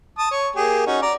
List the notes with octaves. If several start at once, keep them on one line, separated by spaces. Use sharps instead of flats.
A5 D#6
C#5
A#3 G4 G#4
C#4 D#4 F#4
D5 A#5